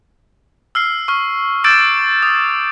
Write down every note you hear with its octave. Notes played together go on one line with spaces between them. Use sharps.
E6 F6 C7
C#6 F6
D6 E6 G6 A6 D7 E7
D#6